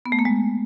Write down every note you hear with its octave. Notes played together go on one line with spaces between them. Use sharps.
B3
A3
A#3
G#3